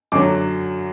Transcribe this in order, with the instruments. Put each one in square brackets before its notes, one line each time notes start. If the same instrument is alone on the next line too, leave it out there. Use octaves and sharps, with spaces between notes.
[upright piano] F#2 D3 F#3 D6